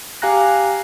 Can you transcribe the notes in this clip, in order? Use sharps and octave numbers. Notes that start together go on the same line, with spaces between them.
G4 F5 G#5 A#5 F#6 A#6